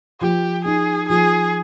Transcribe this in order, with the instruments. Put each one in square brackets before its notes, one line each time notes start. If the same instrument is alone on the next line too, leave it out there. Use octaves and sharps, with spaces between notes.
[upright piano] F3 [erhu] G4
[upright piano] D#4 [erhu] G#4
[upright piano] F3 [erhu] G#4